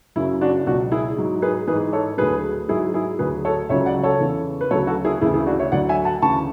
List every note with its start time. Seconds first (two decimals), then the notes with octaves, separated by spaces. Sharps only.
0.16 F#2 C#3 F#3 E4
0.41 D4 F#4
0.66 C#2 B2 F#3 D4 F#4
0.92 E4 G#4
1.17 G#2 F#3
1.42 G#4 B4
1.67 G#2 E3 G#4 B4
1.93 A4 C#5
2.18 D2 D3 F#3 G#4 B4
2.68 G#2 F#3 E4 G#4
2.94 E4 G#4
3.19 D2 D3 F#3 G#4 B4
3.45 A4 C#5
3.69 C#2 C#3 F#3 C#5 E5
3.86 D5 F#5
4.03 A4 C#5
4.21 E2 C#3 E3
4.61 B4
4.71 D2 C#3 F#3 A4 C#5
4.87 F#4 A4
5.05 E4 G#4
5.21 D2 C#3 E3 E4 G#4
5.34 E4 G#4
5.46 D4 F#4
5.59 C#5 E5
5.72 D2 D3 F#3 D5 F#5
5.89 E5 G#5
6.05 F#5 A5
6.22 D2 C#3 E3 A5 C#6